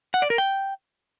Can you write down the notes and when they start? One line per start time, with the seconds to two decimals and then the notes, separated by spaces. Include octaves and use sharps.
0.14 F#5
0.22 D5
0.30 A#4
0.38 G5